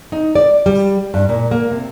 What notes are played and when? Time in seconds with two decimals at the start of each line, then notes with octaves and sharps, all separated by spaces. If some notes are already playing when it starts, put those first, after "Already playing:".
0.12 D#4
0.35 D5
0.66 G3
1.14 G2
1.29 A#2
1.51 A#3
1.71 C3